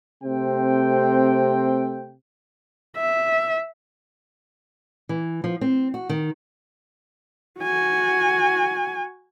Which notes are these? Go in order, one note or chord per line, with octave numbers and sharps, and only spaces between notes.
C3 A3 C4 G5
E5
E3
F3
C4
F#4
D#3
F#4 G#5